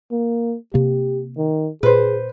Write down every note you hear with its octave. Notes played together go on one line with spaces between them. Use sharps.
A#3
C3 A#3 G4
D#3
A#2 G#4 B4 C5